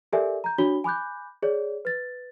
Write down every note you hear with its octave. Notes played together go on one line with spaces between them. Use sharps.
G4 A4 A#4 D5 E5 G#5
A#5 G6
D4 F#4 C#5 B5 G7
G#5 B5 D6 F#6 G6
G#4 C#5 D5
B4 A6